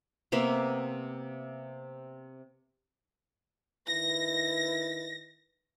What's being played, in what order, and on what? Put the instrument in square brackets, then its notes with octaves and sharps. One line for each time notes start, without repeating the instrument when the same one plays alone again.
[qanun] C3 A#3 B3 E5
[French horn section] D#3 E4 B4 [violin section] A#6